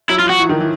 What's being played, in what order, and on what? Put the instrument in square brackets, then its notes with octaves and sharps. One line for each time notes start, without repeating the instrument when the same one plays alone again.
[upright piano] F#3 [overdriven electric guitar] E4
[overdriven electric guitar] F4
[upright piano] F3
[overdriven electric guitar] F#4
[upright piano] E3
D#3
E3